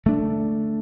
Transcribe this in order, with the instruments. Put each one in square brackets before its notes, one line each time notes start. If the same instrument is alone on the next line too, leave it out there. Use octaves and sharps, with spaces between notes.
[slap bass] D3 A3 D4